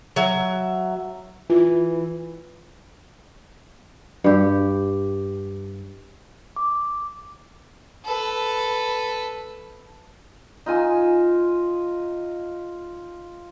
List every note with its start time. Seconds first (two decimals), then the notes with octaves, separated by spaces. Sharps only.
0.16 F#3 E5
1.50 E3 F4
4.24 G2 G4
6.56 D6
8.05 A4 B4
10.66 D#4 F4 G#5 E6